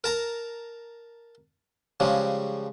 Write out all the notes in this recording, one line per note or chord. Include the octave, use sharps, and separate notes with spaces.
A#4 A5 A#5
C#3 F3 G3 G#3